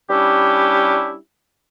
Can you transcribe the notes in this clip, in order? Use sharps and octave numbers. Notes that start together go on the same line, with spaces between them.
G3 C#4 D4 E4 G4